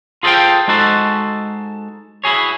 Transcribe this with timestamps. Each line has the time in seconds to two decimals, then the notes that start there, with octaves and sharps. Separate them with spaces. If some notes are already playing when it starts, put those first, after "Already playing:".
0.23 F4 G#4 A4 C5 F5 G5
0.68 G#3 D#4 F#4 A4 C5
2.24 E4 F#4 G#4 C#5